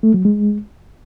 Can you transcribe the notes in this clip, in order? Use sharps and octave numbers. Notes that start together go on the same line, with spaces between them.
A3
F#3
G#3